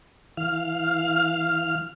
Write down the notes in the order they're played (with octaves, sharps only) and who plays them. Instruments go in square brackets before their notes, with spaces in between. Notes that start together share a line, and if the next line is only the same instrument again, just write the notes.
[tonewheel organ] E3 F5 F6